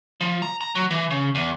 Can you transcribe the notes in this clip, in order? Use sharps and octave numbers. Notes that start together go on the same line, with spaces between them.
F3
A#5
A#5
F#3
E3
C#3
E2